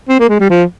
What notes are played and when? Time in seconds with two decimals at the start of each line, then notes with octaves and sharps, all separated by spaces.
0.09 C4
0.20 A#3
0.29 G#3
0.40 G3
0.50 F3